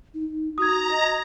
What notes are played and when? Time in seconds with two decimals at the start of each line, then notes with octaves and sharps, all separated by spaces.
0.14 D#4
0.58 F#4 A#5 D#6 G#6
0.91 D#5